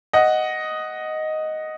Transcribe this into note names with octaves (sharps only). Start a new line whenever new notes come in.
D#5 F#5